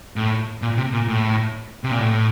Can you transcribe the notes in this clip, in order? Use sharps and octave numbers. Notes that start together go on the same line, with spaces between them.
A2
A#2
C3
A#2
A2
C3
A#2
A2